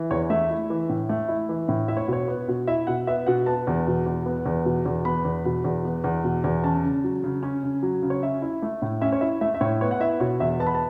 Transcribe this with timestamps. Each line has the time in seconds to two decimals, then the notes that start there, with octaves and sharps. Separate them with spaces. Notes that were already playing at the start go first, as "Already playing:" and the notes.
Already playing: E3
0.11 E2 C#5
0.30 A3 E5
0.50 E4
0.70 E3
0.89 A2
1.09 A3
1.28 E4
1.49 E3
1.68 A2
1.88 E4 E5
1.97 C#5
2.08 B2 C#5
2.28 B3
2.48 B2
2.68 E4 E5
2.87 B2 F#5
3.07 B3 E5
3.27 B2 F#5
3.46 B3 A5
3.67 E2
3.87 B2
4.06 E2
4.26 B3
4.46 E2
4.65 B2
4.86 E2
5.05 B3 B5
5.25 E2
5.45 B2
5.64 E2
5.85 B3
6.04 E2
6.24 B2
6.44 E2
6.63 C#4 A5
6.84 C#3
7.04 F#3
7.24 C#3
7.43 C#4
7.63 C#3
7.83 F#3
8.03 C#3
8.10 C#5
8.23 C#4 E5
8.42 E4
8.62 A3
8.82 A2
9.01 C#4 E5
9.12 C#5
9.21 E4 E5
9.41 A3 E5
9.54 E5
9.61 A2 C#5
9.81 B3 C#5
9.91 F#5
10.00 E4 E5
10.20 B2 C#5
10.40 E2 E5
10.60 B3 A5
10.67 B5
10.74 A5